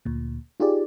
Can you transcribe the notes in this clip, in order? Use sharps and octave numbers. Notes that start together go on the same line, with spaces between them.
D2 A#2
D#4 F4 G4 G#4 D5